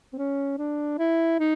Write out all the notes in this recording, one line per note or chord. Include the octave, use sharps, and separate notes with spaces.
C4
C#4
D4
E4
D#4